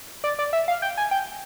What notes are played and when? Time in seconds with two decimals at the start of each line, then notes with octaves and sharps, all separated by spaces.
0.24 D5
0.39 D5
0.53 E5
0.68 F5
0.82 G5
0.97 G#5
1.11 G5